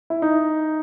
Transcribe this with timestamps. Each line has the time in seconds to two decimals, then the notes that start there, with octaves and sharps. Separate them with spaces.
0.10 E4
0.22 D#4